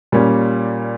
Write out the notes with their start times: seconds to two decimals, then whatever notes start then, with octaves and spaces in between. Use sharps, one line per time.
0.12 A#2 G3 A#3 C#4